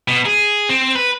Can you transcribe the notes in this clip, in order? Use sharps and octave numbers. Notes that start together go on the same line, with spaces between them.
B2
G#4
C4
B4